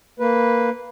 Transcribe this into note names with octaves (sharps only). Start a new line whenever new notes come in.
A#3 B4